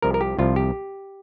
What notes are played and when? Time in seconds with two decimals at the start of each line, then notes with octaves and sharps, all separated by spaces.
0.02 C2 C3 F3 A#4
0.14 A#4
0.21 G4
0.39 C2 C3 F3 F4
0.56 G4